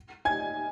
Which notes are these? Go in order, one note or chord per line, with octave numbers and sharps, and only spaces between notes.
G#5 G#6